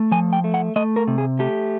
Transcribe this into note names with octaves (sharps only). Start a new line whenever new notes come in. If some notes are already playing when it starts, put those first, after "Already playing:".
Already playing: A3
F3 G#5
G5
A3
F#5
A3 D#5
A#4
C3
G#4
A3 G4